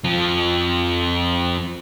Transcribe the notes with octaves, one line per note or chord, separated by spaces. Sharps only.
F2 F3